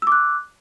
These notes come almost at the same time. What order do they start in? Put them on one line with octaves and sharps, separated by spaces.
E6 D6 F#6